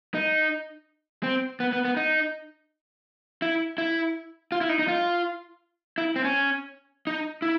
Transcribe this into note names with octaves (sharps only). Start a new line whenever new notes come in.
D#4
C4
B3
B3
B3
D#4
E4
E4
F4
E4
D#4
D#4
F4
E4
C4
C#4
D#4
E4